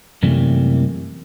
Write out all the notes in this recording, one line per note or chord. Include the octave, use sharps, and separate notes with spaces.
F#2 C3 E3 G3 A3 A#3